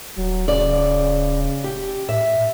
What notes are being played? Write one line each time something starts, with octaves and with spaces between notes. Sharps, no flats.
D#1 F#3
C#3 D5
G4
A2 E5